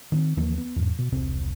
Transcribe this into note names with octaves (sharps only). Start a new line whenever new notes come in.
D#3 B3 C4
D#2 E3 F3 A#3
B3
E2 G#2
B2
E1 C2 C3 C4